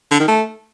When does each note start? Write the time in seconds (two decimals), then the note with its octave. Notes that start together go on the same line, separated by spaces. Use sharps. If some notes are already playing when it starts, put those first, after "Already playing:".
0.11 D3
0.20 D#3
0.28 A3